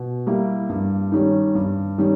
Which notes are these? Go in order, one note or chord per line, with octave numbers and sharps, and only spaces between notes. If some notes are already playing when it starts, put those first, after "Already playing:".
Already playing: B2
G3 A#3 E4 G4
G2
D#3 G3 C#4
G2
D#3 G3 C#4